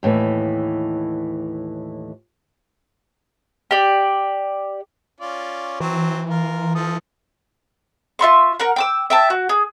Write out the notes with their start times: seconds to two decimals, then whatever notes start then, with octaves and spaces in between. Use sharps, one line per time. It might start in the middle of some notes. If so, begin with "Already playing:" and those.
0.03 D#2 A2 D3 E3
3.71 G4 D5
5.20 C#4 F4 D5
5.80 E3 F#3 C4
6.30 F4 A#4
6.75 F3 A4 D#6
8.19 F4 E5 C6 C#6
8.60 A#4 F#5
8.76 G5 D6 E6
9.10 E5 G5 A5
9.30 F#4
9.49 G#4